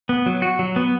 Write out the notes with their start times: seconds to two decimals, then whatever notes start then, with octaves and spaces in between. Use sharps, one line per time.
0.09 B3
0.26 F#3
0.42 F#4
0.59 F#3
0.76 B3